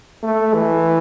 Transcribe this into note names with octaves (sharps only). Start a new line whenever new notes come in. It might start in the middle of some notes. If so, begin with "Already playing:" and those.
A3
E3